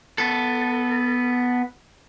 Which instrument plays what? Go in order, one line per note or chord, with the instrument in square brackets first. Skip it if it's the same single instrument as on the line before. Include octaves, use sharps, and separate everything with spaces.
[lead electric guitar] B3 A4